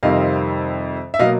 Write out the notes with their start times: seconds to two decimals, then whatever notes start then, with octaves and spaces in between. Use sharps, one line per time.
0.03 F2 C3 D#3 G3 C4 D#5 F5
1.14 E5
1.19 B2 F#3 A#3 D#5 F5